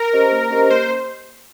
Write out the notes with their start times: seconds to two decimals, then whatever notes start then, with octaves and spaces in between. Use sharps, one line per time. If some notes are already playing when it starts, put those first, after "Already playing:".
Already playing: A#4
0.13 C#4 G4 C5 D#5
0.32 A#3
0.51 C#4 G4 C5 D#5
0.70 A#3 C5